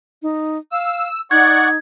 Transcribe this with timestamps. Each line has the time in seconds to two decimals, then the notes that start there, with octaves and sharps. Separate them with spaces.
0.22 D#4
0.72 F5 E6
1.31 D#4 D5 F#5 C#6 G#6